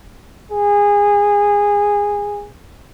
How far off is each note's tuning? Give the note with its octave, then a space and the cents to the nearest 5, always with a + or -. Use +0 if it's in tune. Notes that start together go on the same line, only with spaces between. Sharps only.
G#4 -20